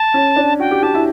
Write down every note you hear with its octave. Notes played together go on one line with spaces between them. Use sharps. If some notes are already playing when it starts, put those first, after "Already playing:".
Already playing: A5
C#4
D4
F#4 G5
G4
G4 A5
E4